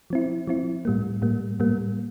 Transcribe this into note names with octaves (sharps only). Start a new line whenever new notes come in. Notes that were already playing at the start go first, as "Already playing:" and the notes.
F3 C4 E4
F3 C4 E4
A2 G3 A#3
A2 G3 A#3
A2 G3 A#3